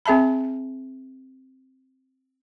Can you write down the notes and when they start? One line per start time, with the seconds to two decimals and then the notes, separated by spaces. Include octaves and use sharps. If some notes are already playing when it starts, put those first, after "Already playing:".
0.06 C4 G#4 E5 A5 B5